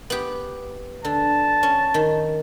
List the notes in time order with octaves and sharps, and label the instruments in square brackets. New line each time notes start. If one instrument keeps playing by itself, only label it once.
[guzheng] B3 G4
[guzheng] D3 [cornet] A5
[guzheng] C#4
D#3